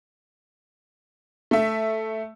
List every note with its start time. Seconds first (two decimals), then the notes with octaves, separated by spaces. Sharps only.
1.51 A3 E5